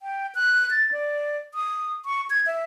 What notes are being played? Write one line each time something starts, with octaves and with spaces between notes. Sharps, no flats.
G5
F#6
A6
D5
D#6
C#6
G#6
E5